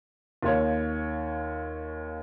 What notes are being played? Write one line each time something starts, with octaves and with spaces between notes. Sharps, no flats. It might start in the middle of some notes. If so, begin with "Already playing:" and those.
D#2 F4 C#5